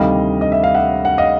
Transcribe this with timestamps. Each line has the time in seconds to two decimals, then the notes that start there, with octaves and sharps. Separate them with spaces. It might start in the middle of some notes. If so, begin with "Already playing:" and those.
Already playing: D2 C3 D#3 G3 D#5 F5
0.41 D#5
0.52 E5
0.64 F5
0.75 E5 F#5
1.05 F#5
1.18 D#5 F5